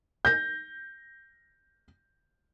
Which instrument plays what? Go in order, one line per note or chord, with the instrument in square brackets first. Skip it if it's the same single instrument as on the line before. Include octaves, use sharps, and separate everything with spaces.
[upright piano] G6 A#6